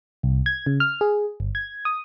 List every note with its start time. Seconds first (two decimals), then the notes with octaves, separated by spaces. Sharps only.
0.23 C2
0.46 G#6
0.67 C#3
0.80 F6
1.01 G#4
1.40 G1
1.55 G#6
1.85 D#6